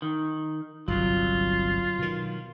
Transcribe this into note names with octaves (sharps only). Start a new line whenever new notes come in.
D#3
G1 C2 F#3 F4
B2 D#3